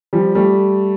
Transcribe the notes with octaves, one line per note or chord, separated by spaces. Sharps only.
F3 G3
G3 A3